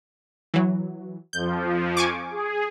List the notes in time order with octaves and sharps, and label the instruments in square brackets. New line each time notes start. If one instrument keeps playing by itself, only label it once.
[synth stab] E3 F#3
[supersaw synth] F2 F3 [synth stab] G6
[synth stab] G#5 C#6 D6
[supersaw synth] G#4